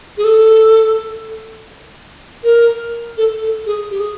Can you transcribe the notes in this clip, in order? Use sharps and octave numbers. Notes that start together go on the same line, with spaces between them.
G#4
A4
A#4
A4
A4
G#4
G4
G#4